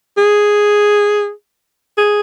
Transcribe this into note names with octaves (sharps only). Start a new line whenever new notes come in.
G#4
G#4